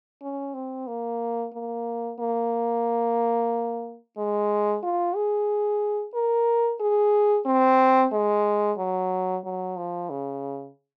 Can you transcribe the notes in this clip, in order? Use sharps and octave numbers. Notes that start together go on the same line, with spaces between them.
C#4
C4
A#3
A#3
A#3
G#3
F4
G#4
A#4
G#4
C4
G#3
F#3
F#3
F3
C#3